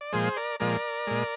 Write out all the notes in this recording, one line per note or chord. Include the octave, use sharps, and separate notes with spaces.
D5
A#2 F3 G#3 G#4 C5
A#4 D5
A#2 F3 G#3 A#4 D5
A#2 G#3